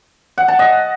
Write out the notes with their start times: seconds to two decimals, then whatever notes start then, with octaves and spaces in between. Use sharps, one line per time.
0.38 F#5
0.48 A5
0.59 D#5